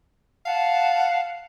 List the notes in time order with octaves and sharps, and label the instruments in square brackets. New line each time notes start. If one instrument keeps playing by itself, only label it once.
[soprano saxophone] F5 [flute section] F#5 A5